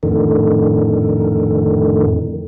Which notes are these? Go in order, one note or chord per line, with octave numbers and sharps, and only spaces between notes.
F2 A2 D3 D#3